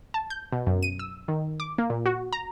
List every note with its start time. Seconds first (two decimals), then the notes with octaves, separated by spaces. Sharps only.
0.14 A5
0.30 G6
0.53 B2
0.67 F#2
0.83 D#7
0.99 E6
1.28 D#3
1.60 D6
1.78 A#3
1.90 A#2
2.06 F#4
2.33 A#5